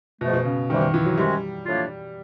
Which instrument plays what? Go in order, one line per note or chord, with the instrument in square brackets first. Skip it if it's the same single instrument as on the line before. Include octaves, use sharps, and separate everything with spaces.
[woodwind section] G#2 F3 A3 [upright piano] B2
[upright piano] B2
C#3
[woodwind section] C3 E3 G3 [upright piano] D#3
[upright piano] D#3
E3
F#3
[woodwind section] C3 D#3 G#3 C#4 F#4 [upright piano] G3
[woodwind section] A2 F3 A#3 D4 F4